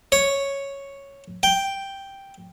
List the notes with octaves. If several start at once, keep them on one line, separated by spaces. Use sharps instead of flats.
C#5
G5